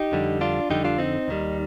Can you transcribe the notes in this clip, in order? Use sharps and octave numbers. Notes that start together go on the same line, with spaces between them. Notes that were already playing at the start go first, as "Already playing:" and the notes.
Already playing: D#4 G4
F2 D3 G3
D4 F4
F2 D3 G3 D#4 G4
D4 F4
C4 D#4
D#2 D#3 G3